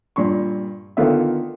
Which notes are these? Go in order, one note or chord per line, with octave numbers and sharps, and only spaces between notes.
G2 A#2 C6 C#6
D3 D#3 B3 F4 E5